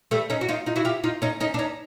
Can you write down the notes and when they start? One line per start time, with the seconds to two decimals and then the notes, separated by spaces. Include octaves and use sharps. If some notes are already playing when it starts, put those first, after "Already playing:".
0.11 G3 A3
0.30 C#4 D#4
0.41 F#4
0.49 D#4 F4
0.66 D#4 F4
0.76 E4 F#4
0.85 F4 G4
1.04 D#4 F4
1.22 C#4 D#4
1.40 C#4 D#4
1.54 D4
1.59 C#4 D#4